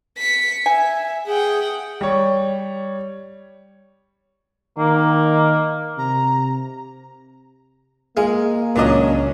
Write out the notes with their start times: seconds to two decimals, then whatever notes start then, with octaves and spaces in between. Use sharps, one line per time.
0.17 B6 C#7
0.66 E5 G#5
1.27 G#4 F#5 G5
2.01 G3 C#5
4.78 D#3 A#3
5.98 C3 A#5
8.17 G#3 A#3 G#4 F5 D#6
8.76 C#2 A#2 F#3 C#4 D4 D#5